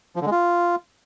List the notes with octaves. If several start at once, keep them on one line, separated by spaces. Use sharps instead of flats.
F3
D3
G#3
F4